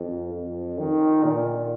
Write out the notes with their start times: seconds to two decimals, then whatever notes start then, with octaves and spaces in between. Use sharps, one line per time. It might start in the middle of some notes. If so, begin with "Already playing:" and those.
Already playing: F2
0.34 F2
0.79 D#3
1.24 A#2